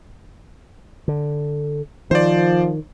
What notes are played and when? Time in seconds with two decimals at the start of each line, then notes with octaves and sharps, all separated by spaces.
1.08 D3
2.11 D#3 F3 C5 D5